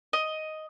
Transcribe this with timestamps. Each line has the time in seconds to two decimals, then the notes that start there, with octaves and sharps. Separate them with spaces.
0.13 D#5